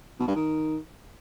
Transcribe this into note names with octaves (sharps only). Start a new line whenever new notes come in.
B2
G2
D#3